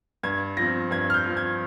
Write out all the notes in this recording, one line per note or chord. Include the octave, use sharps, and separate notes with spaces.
G2 G#6
F3 C4 A#6
G2 G#6
F6
G6
F3 C4
G#6